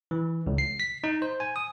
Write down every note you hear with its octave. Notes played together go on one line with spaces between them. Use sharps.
E3
C#2
C7
B6
D#4
C5
G#5
D#6